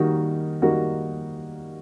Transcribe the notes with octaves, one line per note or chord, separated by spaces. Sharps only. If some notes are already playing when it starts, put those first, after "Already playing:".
Already playing: D#3 G3 A#3 D#4 F#4
D#3 G3 A#3 D#4 F#4